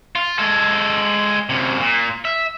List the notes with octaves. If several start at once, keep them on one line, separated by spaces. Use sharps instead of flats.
F4
G#3 A4
F#2 C3
A#2
E5